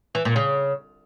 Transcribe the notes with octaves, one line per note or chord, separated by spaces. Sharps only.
E3
A#2
C#3